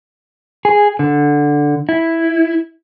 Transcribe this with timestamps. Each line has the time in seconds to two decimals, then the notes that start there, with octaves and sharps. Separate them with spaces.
0.65 G#4
0.99 D3
1.89 E4